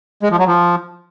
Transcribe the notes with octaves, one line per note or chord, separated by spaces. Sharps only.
G#3
F3
F#3
F3